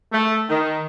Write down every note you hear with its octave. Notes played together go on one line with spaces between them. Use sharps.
A3
D#3